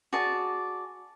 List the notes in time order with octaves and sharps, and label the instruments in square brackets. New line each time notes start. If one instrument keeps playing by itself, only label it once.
[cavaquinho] F#4 G#4 D5 A5